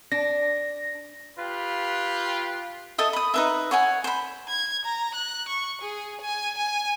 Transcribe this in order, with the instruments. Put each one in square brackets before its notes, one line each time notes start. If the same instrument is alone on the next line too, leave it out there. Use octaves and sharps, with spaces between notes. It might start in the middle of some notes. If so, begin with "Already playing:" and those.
[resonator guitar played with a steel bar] D4 [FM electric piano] A#6
[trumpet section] F4 G4 B4
[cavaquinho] A4 D#5 E5
B5 D#6
D#4 B4 E5
C#5 F#5 G#5
C5 B5
[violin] G#6
A#5
F#6
C#6
G#4
G#5
G#5